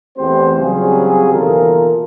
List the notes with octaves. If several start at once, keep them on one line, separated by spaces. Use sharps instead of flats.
E2 A3 C4 G4 C5
C#3 F#3 G3 C4 F4 G#4
D#2 B2 E3 F4 A4 A#4